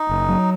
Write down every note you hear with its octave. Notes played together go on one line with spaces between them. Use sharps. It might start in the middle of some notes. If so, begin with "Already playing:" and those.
Already playing: D#4
F#1
F#3